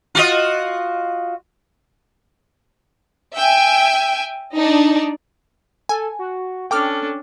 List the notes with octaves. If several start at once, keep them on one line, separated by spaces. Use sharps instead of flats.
F4 F#4 D#5
E5 G5 G#5
D4 D#4
A4 G#5
F#4
C#4 D4 A4 G5 D6 F6